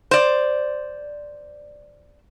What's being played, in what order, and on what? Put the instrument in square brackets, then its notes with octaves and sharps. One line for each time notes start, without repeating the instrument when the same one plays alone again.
[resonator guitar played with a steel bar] C5 D5